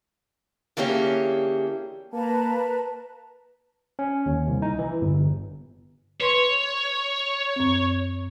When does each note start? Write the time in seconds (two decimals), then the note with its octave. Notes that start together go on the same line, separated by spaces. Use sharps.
0.77 D3 E3 A#3 C#4 G4 G#4
2.13 A#3 B4 A5 A#5
3.99 C#4
4.26 D#2
4.48 C2
4.62 D#4
4.79 E3
5.01 G1
6.21 B4 C#5 C6 C#6
7.56 F#2 C4